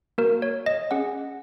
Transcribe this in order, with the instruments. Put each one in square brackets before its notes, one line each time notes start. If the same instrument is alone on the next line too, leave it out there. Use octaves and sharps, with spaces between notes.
[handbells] A#3 F#4 A#4
C#5
D#5
C#4 G#4 F#5